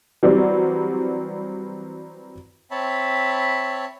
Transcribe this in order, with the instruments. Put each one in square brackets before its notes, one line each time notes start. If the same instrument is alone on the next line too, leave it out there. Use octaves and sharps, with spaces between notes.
[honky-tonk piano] E3 F#3 G3 C4 D5
[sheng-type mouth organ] C4 C#5 E5 A5 B5